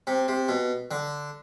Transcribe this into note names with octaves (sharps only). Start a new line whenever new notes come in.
C3
C3
B2
D3